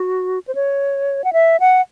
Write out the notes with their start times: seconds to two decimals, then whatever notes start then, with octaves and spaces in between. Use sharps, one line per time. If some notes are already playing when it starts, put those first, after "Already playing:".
Already playing: F#4
0.48 C5
0.55 C#5
1.24 F#5
1.33 E5
1.60 F#5